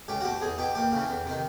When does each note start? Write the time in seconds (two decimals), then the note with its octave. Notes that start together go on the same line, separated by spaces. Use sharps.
0.08 C#2 G4
0.21 F#4
0.25 B2 G4
0.41 E2 G#4
0.58 B2 G4
0.75 D#2 G4
0.92 C#3 E3
1.08 E2
1.26 C3 D#3